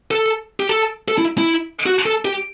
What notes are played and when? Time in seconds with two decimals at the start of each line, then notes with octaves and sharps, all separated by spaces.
0.11 A4
0.60 G4
0.69 A4
1.08 A4
1.18 E4
1.38 E4
1.86 F#4
2.06 A4
2.25 G4